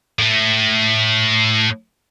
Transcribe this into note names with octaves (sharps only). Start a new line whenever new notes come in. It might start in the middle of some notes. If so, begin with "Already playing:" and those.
A2 A3